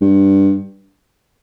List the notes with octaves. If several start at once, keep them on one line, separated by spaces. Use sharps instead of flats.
G2